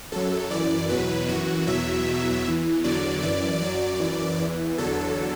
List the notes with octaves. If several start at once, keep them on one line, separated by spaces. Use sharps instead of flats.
F#2 F#3 A4
F#2 E3 D5
E2 B2 F#3 B4
F#2 E3 F#4
E2 B2 F#3 E5
E2 B2 F#3
E2 E3
E2 D3 F#3 D5
F#2 E3 D5
F#2 F#3 D5
F#2 E3
E2 E3
E2 D3 F#3 A4